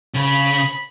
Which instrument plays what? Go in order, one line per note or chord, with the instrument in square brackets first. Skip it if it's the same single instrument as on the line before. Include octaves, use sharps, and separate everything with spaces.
[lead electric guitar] C#3 [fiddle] B5